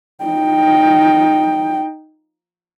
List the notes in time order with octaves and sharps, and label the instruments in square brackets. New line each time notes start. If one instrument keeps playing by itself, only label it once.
[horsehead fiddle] D#4 G5